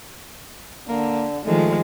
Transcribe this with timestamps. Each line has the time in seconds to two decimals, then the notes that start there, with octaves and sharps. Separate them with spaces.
0.89 D3 A#3
1.46 D#3 F3 G#3 A3